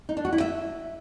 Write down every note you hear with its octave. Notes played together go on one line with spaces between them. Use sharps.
D#4
D4
F#4
E4
E5